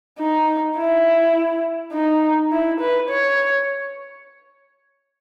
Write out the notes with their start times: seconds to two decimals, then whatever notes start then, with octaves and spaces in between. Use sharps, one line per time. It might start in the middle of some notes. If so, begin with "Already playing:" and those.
0.19 D#4
0.77 E4
1.93 D#4
2.52 E4
2.80 B4
3.09 C#5